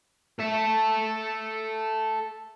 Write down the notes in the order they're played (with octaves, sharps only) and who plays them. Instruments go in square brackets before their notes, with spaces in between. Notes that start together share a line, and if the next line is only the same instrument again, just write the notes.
[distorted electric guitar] A4 E5